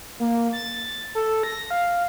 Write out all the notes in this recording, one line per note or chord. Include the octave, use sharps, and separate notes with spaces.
A#3
A6
A4
A#6
F5